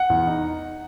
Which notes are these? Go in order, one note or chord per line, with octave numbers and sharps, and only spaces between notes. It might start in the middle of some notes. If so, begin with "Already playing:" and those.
Already playing: F#5
E2
D#4